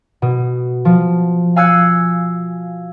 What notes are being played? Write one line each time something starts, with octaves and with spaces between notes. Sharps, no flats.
B2
F3
F5 G#5 E6 F#6 G#6 C#7